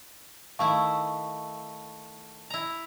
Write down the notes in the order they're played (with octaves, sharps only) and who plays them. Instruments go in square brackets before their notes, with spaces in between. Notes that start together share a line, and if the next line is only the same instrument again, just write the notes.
[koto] D#3 A3 E4 [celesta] F5 A5 C#6
[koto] E4 A#5